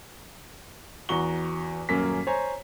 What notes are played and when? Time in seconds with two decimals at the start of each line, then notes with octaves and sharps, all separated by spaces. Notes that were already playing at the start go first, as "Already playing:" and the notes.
1.09 E2 F#4 A#5 C#6 G7
1.89 D#1 F#2 A#3 C#4 B6
2.27 C5 C#5 G#5 A#5